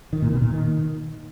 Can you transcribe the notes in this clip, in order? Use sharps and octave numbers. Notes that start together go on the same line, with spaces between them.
D#3
A#2
B2
A#2
D#3